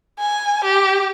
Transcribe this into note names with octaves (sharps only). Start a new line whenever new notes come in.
G#5
G4